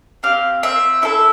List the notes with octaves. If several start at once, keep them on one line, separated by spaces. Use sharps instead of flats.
C4 G4 F5
C4 E5
E4 A4 E5